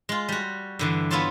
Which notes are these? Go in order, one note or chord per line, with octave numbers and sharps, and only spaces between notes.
G#3 F4
G3 F#4
G2 D3 E3
B3 E4 F4 C#5 A5 C6